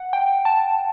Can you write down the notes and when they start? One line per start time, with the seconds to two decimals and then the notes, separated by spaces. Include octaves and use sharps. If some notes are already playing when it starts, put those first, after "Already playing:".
Already playing: F#5
0.13 G5
0.45 A5